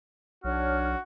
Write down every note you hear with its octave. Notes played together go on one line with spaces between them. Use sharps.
B1 D4 F#4 C#5 F6